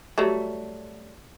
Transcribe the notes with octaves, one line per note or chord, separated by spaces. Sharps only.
F#3 G3 A3